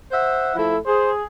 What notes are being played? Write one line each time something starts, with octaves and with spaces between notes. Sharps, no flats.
C5 E5 F#5
F3 A3 E4 A4
G#4 C5